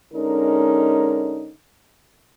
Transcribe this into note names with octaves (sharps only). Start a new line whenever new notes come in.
D3 G#3 C#4 D#4 A#4